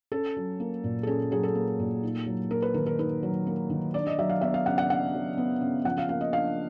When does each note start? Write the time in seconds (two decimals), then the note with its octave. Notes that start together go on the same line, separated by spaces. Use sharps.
0.12 C#4 A4
0.37 F#3
0.60 A#3
0.84 A#2
1.03 A4
1.07 C#4 G#4
1.31 F#3 G#4
1.43 A4
1.55 A#3
1.80 A#2
2.03 D#4
2.27 F#3
2.51 A#3 A#4
2.62 B4
2.74 D#3 A#4
2.86 A#4
2.99 D#4 B4
3.23 F#3
3.47 A#3
3.70 D#3
3.94 D4 D5
4.07 D#5
4.18 F#3 E5
4.30 F5
4.41 B3 E5
4.54 F5
4.66 C#3 F#5
4.78 F#5
4.90 D4 F#5
5.14 F#3
5.38 B3
5.61 C#3
5.85 F3 F#5
5.98 F5
6.09 A#3 F5
6.21 D#5
6.33 D4 F5